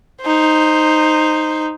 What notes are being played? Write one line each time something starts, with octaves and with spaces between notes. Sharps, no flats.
D#4 C5